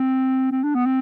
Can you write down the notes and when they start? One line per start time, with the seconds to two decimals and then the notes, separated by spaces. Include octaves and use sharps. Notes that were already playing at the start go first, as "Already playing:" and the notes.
Already playing: C4
0.51 C4
0.63 D4
0.75 B3
0.86 C4